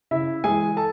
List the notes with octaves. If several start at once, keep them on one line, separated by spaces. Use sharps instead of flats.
C#3 E4 E5
E3 G#3 G#4 G#5
A4 A5